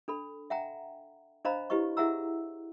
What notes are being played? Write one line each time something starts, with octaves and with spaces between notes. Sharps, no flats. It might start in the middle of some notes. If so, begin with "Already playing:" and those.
D4 A4 B5
E5 F#5 G5 A#5
D4 C5 D#5 F5 A#5 B5
E4 G4 B4 D#5 C#6
E4 G#4 E5 F#5 A#5 E6